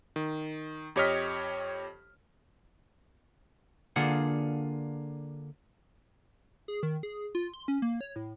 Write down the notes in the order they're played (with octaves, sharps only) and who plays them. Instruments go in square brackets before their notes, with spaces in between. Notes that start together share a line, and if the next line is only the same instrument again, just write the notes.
[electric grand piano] D#3
F2 G4 C#5 D#5 F6 B6
[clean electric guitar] D3 A#3 D4 F4 G#4 F#5
[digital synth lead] G#4
D#3
G#4
F4
C6
C#4
A#3
C#5
A2